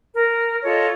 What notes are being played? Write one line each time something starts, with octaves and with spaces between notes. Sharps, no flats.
A#4
F4 A4 C#5 D#5